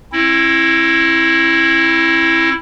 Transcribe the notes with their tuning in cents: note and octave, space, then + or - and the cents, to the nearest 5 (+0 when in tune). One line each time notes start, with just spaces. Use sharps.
C4 +40 E4 +0